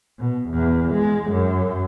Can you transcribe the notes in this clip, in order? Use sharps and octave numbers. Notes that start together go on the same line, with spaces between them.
B2
E2
G#3
F#2